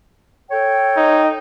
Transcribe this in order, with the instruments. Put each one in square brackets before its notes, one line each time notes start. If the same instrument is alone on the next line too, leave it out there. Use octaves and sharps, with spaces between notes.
[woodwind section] A4 C#5 G5
[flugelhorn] D#4